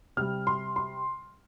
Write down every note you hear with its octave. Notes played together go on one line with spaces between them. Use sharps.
C3 G3 F6
C6
C6